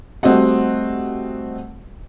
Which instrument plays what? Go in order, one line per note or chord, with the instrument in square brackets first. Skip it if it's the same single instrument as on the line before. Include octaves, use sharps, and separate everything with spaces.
[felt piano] G3 A3 C4 F#4 D#5 F#5